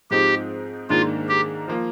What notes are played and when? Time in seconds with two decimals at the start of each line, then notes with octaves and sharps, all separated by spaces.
0.11 G#2 F3 C4 D#4 G4
0.89 G#2 D#3 A#3 D4 F4
1.29 G4
1.68 F3 A#3 F4